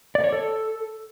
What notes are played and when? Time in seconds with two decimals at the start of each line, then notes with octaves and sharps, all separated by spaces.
0.15 D5
0.24 C#5
0.32 A4